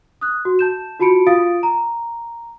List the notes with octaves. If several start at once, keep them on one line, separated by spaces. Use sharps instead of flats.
D#6 F#6
F#4
A5 G6 E7
F4 F#4 A5 B5 C#7 D7
F4 F5 D#6 A6 D7
A#5